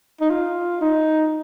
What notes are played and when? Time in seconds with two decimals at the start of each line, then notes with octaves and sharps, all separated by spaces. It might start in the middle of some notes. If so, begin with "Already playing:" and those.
0.21 D#4
0.30 F4
0.81 D#4